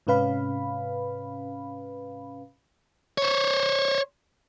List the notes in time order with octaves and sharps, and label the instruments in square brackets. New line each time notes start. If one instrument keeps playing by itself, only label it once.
[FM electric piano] G#2 C3 C#4 B4 F5 B5
[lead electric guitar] C5 C#5